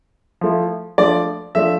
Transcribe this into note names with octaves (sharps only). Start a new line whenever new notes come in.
F3 A3 E4
F3 A3 D4 D5
F3 A3 D4 E5